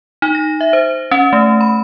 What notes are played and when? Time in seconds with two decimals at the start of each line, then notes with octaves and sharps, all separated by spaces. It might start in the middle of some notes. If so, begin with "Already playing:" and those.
0.22 D#4
0.35 A#6
0.61 E5
0.73 C5
1.11 C#4
1.33 A3
1.61 B5